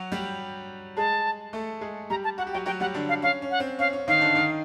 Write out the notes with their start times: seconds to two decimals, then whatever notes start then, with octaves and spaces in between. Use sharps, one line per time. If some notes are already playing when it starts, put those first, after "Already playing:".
Already playing: F#3 F#4
0.12 G3 G4
0.97 G#3 G#4 A5
1.53 A3 A4
1.81 G#3 G#4
2.10 G3 G4 A#5
2.24 A5
2.38 F#4 F#5
2.47 G4
2.52 F#3 F#4 G5
2.66 F#3 F#4 G5
2.80 G3 G4 F#5
2.94 D3 D4
3.09 F5
3.22 C#4 F5
3.42 C#4
3.51 F#5
3.60 C4
3.79 C#4 F5
3.93 C#4
4.08 D#3 D#4 F5
4.21 D3 D4
4.35 D#3 D#4